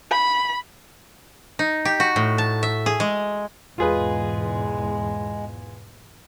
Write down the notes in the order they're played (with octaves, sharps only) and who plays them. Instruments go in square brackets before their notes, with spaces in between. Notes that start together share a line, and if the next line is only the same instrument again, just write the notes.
[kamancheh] B5
[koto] D#4
G4
F#4
A2
A5
E5
G#4
G#3
[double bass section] E2 G#2 B2 [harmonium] G#3 [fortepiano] F4 G#4 B4